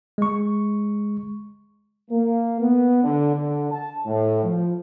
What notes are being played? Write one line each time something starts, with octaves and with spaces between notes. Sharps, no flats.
G#3 C#6
A#3
B3
D3
D3
A5
A2
F3